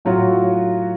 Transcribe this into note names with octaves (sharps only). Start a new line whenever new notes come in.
A2 F#3 F4 F#4